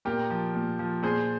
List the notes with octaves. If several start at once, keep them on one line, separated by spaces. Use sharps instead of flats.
A#2 G4 A#4
F3
A#2
F3
A#2 G#4 C5